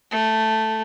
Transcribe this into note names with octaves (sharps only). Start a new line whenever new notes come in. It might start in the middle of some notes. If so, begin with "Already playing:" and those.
A3